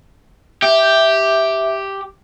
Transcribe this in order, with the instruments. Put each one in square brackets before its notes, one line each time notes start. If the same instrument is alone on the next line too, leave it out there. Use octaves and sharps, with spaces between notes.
[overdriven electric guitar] G4 [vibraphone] E5